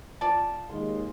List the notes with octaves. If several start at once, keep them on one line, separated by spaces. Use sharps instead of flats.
F4 D5 A5
D#2 G#3 C6